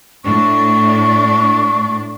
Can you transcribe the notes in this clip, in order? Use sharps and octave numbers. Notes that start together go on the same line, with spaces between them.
A2 D4 C#6